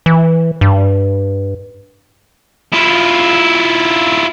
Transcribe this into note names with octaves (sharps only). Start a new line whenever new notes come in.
E3
G2
E4 F4